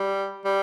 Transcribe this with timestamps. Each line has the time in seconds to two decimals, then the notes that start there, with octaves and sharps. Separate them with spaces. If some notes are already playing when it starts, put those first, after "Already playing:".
Already playing: G3
0.45 G3